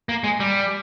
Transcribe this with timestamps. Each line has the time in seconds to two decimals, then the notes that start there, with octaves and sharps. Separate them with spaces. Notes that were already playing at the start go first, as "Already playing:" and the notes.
0.09 A#3
0.24 G#3
0.40 G3